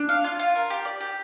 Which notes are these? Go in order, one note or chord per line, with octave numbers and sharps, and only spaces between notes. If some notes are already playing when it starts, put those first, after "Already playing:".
Already playing: D4
F5
F4
F4
A#4
G4
D5
G4